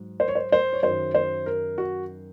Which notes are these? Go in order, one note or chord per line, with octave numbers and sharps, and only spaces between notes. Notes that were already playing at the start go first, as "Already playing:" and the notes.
Already playing: G#2 F#3
C5
C#5
C5
C5
C#5
F#2 D#3 F#3 C5
C5
A#4
F#4